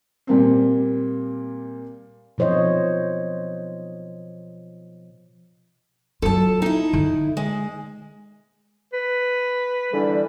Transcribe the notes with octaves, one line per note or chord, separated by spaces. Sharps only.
A#2 G3 A#3 C4
B2 F3 C5 C#5 D#5
F#3 F4 A4 A5
D#4 E4
D3
G#3
B4
D3 E3 G3